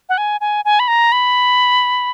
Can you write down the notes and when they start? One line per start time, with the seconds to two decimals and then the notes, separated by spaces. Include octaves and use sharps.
0.09 F#5
0.18 G#5
0.41 G#5
0.65 G#5
0.80 B5
0.88 A#5
1.12 B5